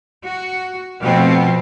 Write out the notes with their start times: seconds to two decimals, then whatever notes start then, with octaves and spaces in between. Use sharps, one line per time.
0.24 F#4
1.00 B2 F3 A3 C4